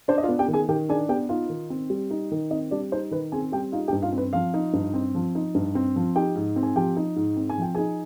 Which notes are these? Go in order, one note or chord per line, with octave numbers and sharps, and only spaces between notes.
D4 C5
D#5
F4 F5
B3
G4 G5
D#3
G#4 G#5
D#3 G4 G5
D4 G#4 G#5
B3 G4 G5
D#4 F4 F5
D#3
C4
G3
D#4
D#3
C4 D#4 D#5
G3 D4 D5
D#4 C5
D#3 B4
C4 G#4 G#5
G3 G4 G5
D#4 F4 F5
G4 G5
G2
F4 F5
C4
B4
F3 F4 F5
D#4
G2
C4
F3
D#4
G2
C4
F3
D#4 G4 G5
G#2
C4
G#5
F3 G4 G5
D#4
G#2
C4
G#5
F3 G5
D#4 G#4 G#5